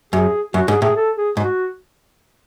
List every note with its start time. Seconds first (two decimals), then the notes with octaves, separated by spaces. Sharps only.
0.13 F#2 G#4
0.54 F#2 F#4
0.68 G#2 G#4
0.82 A2 G#4
0.96 A4
1.16 G#4
1.37 G#2 F#4